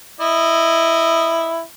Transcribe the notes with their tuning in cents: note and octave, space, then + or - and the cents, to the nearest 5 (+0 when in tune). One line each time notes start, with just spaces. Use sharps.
E4 +0 D#5 -10